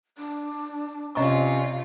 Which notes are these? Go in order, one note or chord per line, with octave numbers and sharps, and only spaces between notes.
D4
C3 C#4 F4 D5 D#5 A#5 C#6